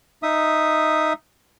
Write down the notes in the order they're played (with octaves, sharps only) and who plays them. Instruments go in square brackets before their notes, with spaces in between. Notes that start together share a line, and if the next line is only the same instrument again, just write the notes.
[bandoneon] D#4 E5 D#6